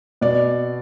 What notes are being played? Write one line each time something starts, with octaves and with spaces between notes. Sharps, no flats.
B2 D5